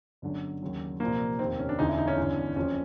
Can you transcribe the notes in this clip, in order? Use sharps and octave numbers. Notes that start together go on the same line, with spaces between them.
G1 F#2 D3 F#3
D#2 C#3 F#3
C2 A#2 F3 A#3
F1 D#2 D#3 C4
C#4
D4
E1 D2 C#3 E3 D#4
E4
D#4
C#4
G1 G2 E3
F#1 F2 C#3 F3 C#4